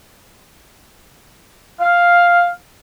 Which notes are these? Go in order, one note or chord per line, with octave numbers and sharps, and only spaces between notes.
F5